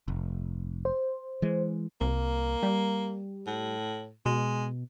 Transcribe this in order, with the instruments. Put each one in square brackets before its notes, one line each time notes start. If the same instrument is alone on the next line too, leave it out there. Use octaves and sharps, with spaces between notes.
[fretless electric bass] F1
[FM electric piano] C5
[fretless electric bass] E3 G#3
[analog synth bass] C2 [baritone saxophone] A#3
[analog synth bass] G3
[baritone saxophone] A2
[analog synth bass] B2 [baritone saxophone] G#3